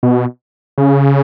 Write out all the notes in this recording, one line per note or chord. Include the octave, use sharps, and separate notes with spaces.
B2
C#3